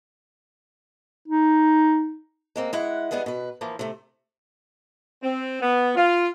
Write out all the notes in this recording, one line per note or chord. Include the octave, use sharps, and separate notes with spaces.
D#4
G#3 A#3 C4
G#3 E4 F#5
G3 G#3 B3 G#4 F#5
B2 B4
E3 F3 A#3
C3 A3
C4
B3
F4